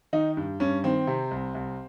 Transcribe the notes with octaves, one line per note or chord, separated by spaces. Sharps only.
D#3 D#4
G2
G2 C#4
D#3 C4
C3
C2
C2